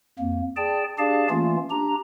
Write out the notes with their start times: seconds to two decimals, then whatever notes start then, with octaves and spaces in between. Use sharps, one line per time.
0.19 F2 A#3
0.56 G#4 D5 G5 A5
0.98 D4 G4 G#4 D5 F5 A5
1.30 E3 A3 A#3 C#4 F4
1.70 D4 G4 A#5